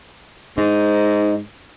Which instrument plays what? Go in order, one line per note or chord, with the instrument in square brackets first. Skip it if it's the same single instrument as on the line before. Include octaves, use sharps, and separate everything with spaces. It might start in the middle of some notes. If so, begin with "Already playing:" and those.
[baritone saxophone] G#2 [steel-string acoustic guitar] D#4